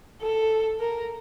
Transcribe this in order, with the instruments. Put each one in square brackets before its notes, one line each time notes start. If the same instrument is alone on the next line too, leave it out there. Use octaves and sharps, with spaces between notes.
[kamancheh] A4
A#4